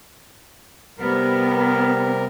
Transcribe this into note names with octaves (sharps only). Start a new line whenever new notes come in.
C3 G3 B3 A#4